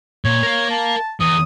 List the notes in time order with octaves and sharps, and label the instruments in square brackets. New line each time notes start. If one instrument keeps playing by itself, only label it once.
[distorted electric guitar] A#2 [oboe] C#5
[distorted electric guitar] A#4 F5
[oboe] A5
[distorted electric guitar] E2 [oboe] D#6